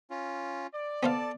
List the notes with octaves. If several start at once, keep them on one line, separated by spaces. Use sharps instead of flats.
C#4 F4
D5
B3 A4 C5 F5 A5